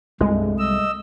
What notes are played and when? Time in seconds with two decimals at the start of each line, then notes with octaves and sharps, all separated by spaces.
0.21 C2 G2 G#3 A3
0.59 D#5 E6